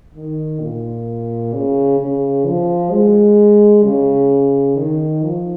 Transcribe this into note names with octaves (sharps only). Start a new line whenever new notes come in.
D#3
A#2
C#3
C#3
F3
G#3
C#3
D#3
F3